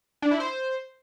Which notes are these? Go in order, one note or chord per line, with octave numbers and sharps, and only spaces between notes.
D4
E4
C5